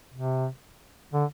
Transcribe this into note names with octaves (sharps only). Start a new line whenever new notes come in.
C3
D3